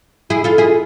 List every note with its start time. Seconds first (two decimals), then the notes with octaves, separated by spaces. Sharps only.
0.30 E4 G#4
0.44 F4 A4
0.58 E4 G#4